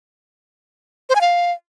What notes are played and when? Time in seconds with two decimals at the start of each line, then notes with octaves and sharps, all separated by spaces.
1.09 C5
1.15 G#5
1.21 F5